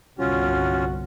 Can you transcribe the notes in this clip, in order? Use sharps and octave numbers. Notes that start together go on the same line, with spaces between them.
G1 C2 C#4 F4 F#4